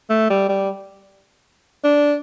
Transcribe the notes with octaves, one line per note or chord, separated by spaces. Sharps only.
A3
G3
G3
D4